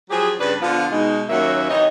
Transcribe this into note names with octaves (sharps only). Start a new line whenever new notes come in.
F3 F#3 G4 G#4
G2 C#3 D4 B4
D3 F3 B3 F4
B2 G#3 D#4
D#2 F#3 A#3 C#4 F#4 E5
C3 E3 D#4 C#5 D#5